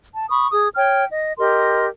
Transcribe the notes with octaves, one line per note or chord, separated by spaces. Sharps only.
A5
B5 C#6 D#6
G#4 D#6
C#5 G5 F6
D#5
G4 A#4 D#5 C6